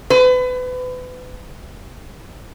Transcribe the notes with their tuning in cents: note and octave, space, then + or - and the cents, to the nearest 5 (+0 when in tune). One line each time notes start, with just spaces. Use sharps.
B4 +30